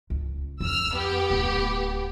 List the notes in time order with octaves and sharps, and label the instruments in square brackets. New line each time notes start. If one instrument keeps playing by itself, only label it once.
[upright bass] C#2
[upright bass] F2 [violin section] E6 F6
[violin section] B3 G4
[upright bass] D1